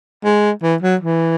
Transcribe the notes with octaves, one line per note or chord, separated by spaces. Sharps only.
G#3
E3
F#3
E3